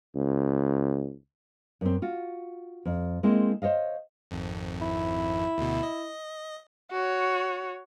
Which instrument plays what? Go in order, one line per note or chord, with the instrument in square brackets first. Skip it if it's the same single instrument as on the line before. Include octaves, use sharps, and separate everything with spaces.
[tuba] C#2
[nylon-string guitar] F#2 C4
F4 F#4
F2
G#3 A#3 C4 E4
C5 C#5 D#5 F5
[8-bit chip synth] G#1 F2
[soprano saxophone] E4
[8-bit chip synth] D2 B2
D#5
[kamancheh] F#4 C#5